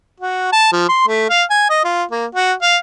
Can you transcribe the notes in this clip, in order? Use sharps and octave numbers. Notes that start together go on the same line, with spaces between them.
F#4
A5
F3
C6
A3
F5
G#5
D#5
F4
A#3
F#4
F5